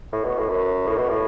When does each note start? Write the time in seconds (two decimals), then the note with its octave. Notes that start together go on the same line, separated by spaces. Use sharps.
0.12 A2
0.25 B2
0.38 A2
0.50 F#2
0.88 A2
0.98 B2
1.09 A2